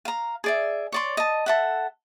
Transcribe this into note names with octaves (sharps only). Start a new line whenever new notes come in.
F5 A#5
G#4 D5 E5
C#5 D5 C6
D#5 A5
A4 E5 F#5